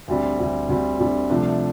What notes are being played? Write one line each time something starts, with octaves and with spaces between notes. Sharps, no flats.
D2 D3 G3 C4
D2 D3 G3 C4
D2 D3 G3 C4
D2 D3 G3 C4
C2 C3 F3 A3 D4